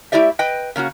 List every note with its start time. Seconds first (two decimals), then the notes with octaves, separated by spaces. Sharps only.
0.12 A3 E4 G4 D5 E5
0.39 B4 D#5 G5
0.76 C#3 A#3 C#4 F#4